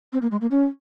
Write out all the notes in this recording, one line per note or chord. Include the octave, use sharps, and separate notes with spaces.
C4
A#3
G#3
A#3
C#4